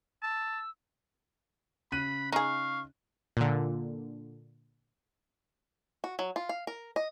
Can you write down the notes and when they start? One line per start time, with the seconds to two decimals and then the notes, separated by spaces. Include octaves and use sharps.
0.22 A5 E6
1.92 C#3 B5 F#6 D#7
2.32 D#4 G#4 F5 C#6
3.37 A#2 D3
6.04 F#4
6.19 F#3
6.36 F4
6.49 F5
6.67 A#4
6.96 D#5